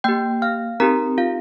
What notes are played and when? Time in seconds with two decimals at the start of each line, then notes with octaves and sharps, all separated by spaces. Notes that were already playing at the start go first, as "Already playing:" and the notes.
0.04 A#3 G4 G5 G6
0.42 F5 F6
0.80 C4 D#4 G4 A#4 A#5
1.18 F4 F5